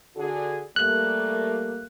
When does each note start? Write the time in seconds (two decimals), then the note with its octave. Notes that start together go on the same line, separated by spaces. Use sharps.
0.16 D3 F#4 G#4
0.76 G3 A3 A#3 F#6